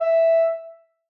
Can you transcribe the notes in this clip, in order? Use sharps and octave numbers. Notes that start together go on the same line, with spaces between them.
E5